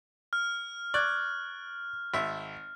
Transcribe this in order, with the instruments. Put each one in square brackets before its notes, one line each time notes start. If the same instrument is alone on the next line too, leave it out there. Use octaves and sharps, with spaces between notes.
[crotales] F6
[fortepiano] D5 [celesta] C#6 F#6 G#6
[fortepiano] G#1 E5